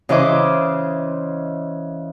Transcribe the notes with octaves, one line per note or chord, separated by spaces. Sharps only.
C#3 E3 C5 D#5 D6